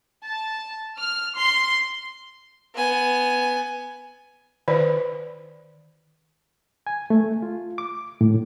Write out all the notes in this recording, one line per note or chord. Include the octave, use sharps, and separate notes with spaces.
A5
F6
C6
B3 G#5
D#3 B4 D5
G#5
A3
F4
D6
A2